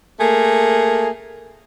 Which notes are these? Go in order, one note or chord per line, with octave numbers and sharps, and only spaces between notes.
A3 A#3 G#4